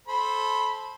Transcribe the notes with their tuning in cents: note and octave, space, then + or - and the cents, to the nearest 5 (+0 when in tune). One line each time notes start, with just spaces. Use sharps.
A4 -20 C5 +10 B5 +0